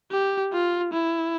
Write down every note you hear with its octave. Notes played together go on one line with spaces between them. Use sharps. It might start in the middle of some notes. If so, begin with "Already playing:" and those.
G4
F4
E4